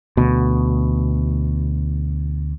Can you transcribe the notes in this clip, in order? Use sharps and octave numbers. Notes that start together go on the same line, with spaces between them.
D2 B2